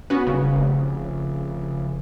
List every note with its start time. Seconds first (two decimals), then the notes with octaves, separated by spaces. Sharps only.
0.10 B3 C#4 F#4 B4
0.27 D#1 C#3
0.53 F1